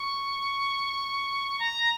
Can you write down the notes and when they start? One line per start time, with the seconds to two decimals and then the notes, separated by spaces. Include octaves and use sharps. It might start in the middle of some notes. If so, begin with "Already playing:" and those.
Already playing: C#6
1.59 A#5